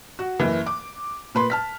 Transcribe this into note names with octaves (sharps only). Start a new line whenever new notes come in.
F#4
F#1 E3
D6
A#2 B4 C6
A5 F6 B6